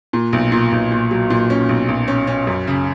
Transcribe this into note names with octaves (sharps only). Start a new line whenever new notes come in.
A#2
B1
A#2
B1
A#2
F#3
A#2
C#4
B1
B1
C#4
C#4
F#2
C#3